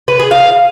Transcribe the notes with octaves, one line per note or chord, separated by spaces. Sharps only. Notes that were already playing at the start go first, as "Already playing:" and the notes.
B4
G#4
F5